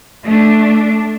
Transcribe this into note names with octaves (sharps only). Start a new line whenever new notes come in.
A3 D4